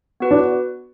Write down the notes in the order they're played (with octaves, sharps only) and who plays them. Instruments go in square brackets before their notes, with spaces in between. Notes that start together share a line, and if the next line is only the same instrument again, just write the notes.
[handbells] B3 F#4 B4
[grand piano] D4